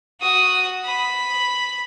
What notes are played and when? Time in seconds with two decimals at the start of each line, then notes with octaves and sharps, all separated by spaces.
0.21 F#4 D#6
0.85 B5